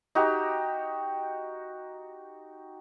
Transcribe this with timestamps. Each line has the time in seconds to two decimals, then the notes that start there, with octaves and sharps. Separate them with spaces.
0.15 D#4 F#4 G4